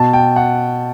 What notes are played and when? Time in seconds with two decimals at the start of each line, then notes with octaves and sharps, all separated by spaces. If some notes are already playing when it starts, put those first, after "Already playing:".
Already playing: B2 A5
0.13 G5
0.36 F#5